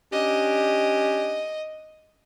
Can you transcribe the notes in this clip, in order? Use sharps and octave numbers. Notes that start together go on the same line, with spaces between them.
C#4 D4 G4 D#5